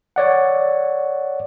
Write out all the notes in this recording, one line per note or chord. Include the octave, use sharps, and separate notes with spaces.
C#5 D5 F#5